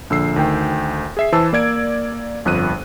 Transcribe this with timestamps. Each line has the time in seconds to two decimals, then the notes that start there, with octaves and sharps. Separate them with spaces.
0.10 A#1 D3 E6 C7
0.36 D2 D#3 G5
1.17 G#4 E5 C7
1.32 E3 C5 A5 E6
1.53 A#3 D5 G#6 D7
2.45 G1 F2 F#6 D#7